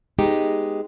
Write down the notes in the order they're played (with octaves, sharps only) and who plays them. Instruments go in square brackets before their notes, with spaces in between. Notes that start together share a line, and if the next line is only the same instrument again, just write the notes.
[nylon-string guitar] G#3 B3 D#4 G4